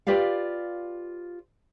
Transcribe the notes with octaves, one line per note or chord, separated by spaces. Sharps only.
F4 G4 B4 D5 F5